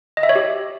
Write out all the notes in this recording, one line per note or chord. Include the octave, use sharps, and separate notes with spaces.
D#5
E5
C#5
G4